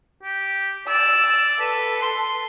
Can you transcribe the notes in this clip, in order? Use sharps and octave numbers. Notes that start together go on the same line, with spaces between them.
G4
D5 E6
A4 B4
C6